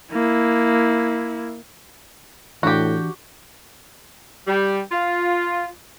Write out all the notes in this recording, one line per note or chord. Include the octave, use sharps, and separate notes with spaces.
A#3 E4
A2 E3 D4 F#4 G4 D5
G3
F4